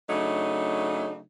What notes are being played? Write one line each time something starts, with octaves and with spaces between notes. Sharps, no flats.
C#3 F#3 A3 D4 D#4